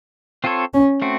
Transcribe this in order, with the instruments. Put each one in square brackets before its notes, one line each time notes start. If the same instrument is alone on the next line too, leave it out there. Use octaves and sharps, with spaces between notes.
[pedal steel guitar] C4 F4 A4 C#5
[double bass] C#4
[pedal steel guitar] A3 C4 F#4